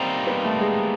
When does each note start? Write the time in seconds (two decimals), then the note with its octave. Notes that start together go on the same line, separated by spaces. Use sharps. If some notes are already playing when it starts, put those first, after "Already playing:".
Already playing: G3 A#3 C4 D#4
0.27 B3
0.44 A3
0.60 G#3